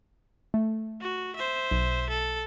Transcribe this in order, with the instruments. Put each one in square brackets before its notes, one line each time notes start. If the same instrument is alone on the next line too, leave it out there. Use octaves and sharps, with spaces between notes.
[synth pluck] A3
[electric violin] F#4
C5 E5
[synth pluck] B1
[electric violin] A4